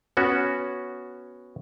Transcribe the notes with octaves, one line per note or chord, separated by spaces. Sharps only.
B3 C#4 F#4